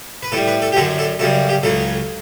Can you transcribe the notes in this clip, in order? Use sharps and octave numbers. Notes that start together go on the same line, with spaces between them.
B4
A2 G3 A4
B4
A4
G4
F#2 D3 F#3 A4
A4
F#2 C#3 G3 A4
G4
C#2 C#3 F#3 A4